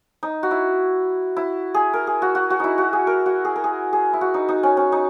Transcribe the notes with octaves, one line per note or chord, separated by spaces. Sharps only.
D#4
F#4
E4
E4
G#4
A#4
G#4
F#4
F#4
F#4
D#4 E4
F#4
G#4
A#4
F#4
G#4
A#4
G#4
G#4
E4
F#4
D#4
D#4
C#4
C#4
D#4